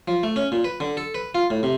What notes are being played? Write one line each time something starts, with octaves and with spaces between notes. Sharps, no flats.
F3
A3
C#4
A#2
B4
D3
A4
B4
F4
A2
C3